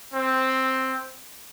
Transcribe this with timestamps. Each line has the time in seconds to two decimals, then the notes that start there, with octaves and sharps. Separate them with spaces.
0.14 C4